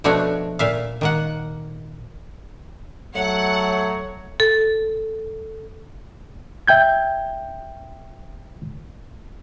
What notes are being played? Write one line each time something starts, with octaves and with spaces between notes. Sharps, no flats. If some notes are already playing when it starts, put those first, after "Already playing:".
B2 F3 A3 D4 F#4 C#5
A#2 E5 F5
D#3 A#3 F#5
F#3 A3 C#5 F#5
A4
E5 G5 G6 G#6